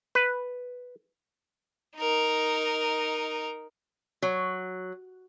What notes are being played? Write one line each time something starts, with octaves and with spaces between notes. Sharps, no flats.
B4
D#4 A#4
F#3